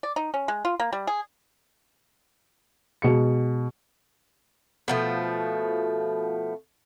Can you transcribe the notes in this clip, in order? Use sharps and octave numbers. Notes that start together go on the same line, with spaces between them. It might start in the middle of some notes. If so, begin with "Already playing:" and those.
D5
D#4
C#4
G#3
F4
A#3
G3
G#4
B2 G#3 C#7
B2 F3 A3